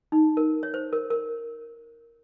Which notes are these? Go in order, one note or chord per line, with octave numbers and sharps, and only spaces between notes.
D#4
A#4
C#5
C5
A#4
A#4